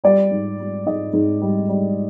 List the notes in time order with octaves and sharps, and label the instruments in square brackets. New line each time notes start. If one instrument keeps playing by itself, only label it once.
[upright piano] G3 D5
G#2
G3
G#2 D#5
G#2
G3
G3